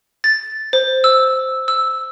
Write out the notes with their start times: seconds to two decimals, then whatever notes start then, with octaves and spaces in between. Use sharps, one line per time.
0.24 A6
0.73 C5
1.04 E6
1.68 E6